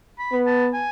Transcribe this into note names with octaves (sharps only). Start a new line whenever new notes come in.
B5
B3
A5
G#5